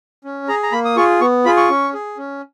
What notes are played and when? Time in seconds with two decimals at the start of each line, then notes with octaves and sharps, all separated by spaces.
0.24 C#4
0.48 G#4 A#5
0.63 A#5
0.72 A#3 B5
0.85 D#6
0.96 F4 G#4 C#6
1.21 B3 C#6
1.45 F4 G#4 B5
1.57 C#6
1.70 C#4
1.93 G#4
2.17 C#4